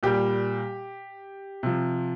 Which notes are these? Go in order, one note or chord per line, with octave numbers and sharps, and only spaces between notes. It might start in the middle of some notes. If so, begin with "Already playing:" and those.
A#2 G3 G4
C3 F3